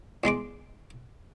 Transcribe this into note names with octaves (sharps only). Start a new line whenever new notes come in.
E2 G#3 C6 D6